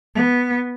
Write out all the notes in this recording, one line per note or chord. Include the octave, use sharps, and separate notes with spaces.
B3